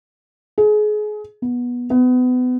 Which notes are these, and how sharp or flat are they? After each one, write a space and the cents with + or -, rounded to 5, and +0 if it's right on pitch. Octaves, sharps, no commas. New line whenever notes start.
G#4 +30
B3 -15
B3 +30